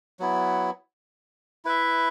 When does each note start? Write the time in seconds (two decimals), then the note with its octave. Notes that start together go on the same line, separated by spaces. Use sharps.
0.20 F#3 B3 E4
1.65 E4 B4 E5